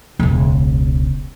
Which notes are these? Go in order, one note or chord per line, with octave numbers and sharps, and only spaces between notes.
E1 C#2